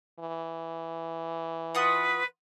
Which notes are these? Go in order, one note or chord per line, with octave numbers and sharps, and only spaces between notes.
E3
F4 B4 F#5 D#6